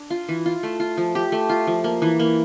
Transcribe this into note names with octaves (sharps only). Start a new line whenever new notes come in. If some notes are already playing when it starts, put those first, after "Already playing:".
Already playing: D4
F4
E3
F4
A3
F4
F3
G4
A3
F4
F3
A#3
E3
A#3